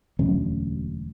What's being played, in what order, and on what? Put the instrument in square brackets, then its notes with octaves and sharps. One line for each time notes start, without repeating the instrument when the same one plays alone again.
[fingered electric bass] E1 D2 F#3 C#4